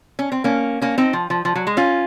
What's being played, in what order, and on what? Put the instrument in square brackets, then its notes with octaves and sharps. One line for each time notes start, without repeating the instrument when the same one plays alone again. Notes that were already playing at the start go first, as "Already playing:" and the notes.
[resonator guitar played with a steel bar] C#4
C4
A#3 C#4
A#3 C#4
C4 D#4
F3
F3
F3
F#3
G#3
C#4 F4